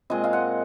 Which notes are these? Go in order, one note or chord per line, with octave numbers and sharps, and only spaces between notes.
A#2 G#3 C4 D#5
F5
F#5